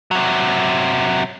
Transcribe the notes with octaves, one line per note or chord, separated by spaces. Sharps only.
C3 F#3